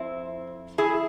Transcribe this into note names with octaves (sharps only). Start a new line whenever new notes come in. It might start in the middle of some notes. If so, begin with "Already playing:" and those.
Already playing: F2 C4 E4
E4 G#4